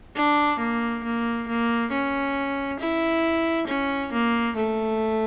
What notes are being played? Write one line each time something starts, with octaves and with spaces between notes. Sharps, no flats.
D4
A#3
A#3
A#3
C#4
E4
C#4
A#3
A3